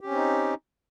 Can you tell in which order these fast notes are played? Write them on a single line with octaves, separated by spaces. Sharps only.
G4 C#4 C4 D#4